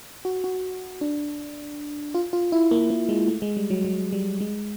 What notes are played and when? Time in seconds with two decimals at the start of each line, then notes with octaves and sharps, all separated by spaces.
0.25 F#4
0.44 F#4
1.01 D4
2.15 F4
2.33 F4
2.52 E4
2.71 A#3
2.90 A#3
3.09 G#3
3.28 A3
3.42 G#3
3.57 G3
3.70 F#3
3.85 F#3
4.13 G3
4.41 G#3